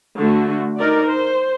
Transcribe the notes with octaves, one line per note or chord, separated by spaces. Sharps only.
D3 A3 F#4
D#4 A#4 D5
C5